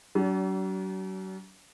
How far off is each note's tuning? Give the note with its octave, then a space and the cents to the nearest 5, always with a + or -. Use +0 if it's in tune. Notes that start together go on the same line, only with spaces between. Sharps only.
F#3 +40 D4 -40